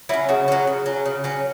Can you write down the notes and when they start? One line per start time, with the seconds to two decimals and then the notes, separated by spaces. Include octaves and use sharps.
0.09 F#3 E4
0.13 C#4
0.29 C#3 F#4
0.48 F#3 C#4
0.67 C#3
0.86 F#3 C#4
1.05 C#3
1.24 F#3 C#4